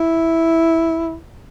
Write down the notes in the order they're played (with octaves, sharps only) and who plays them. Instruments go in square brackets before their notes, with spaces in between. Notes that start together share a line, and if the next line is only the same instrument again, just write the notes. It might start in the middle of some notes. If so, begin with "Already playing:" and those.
Already playing: [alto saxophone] E4